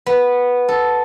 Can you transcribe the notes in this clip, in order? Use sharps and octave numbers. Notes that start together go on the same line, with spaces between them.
B3
A4